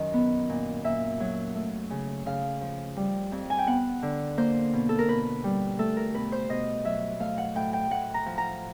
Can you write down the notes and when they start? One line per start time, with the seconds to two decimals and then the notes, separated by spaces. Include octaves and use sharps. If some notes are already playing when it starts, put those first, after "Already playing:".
Already playing: F#2 D#3 F#3 D#5
0.14 B3
0.49 A#2
0.84 A#2 E5
1.20 F#3
1.55 A3
1.90 C#3
2.26 C#3 F5
2.61 F3
2.97 G3
3.32 F2
3.50 G#5
3.59 G5
3.67 B3 F#5
4.02 D3
4.37 A#3 C5
4.73 B2
4.89 A4
4.99 A#4
5.08 B2 B4
5.44 G3
5.79 A3 A4
5.97 A#4
6.14 B2 B4
6.32 C5
6.49 B2 D#5
6.85 F#3 E5
7.20 A3 F5
7.38 F#5
7.55 A2 G5
7.73 G5
7.91 A2 F#5
8.14 A#5
8.26 F3
8.38 A#5